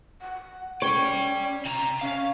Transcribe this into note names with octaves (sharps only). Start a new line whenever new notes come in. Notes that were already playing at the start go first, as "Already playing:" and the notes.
F#5
C#4 C#5 D5 G5
C3 A#5
C#4 F5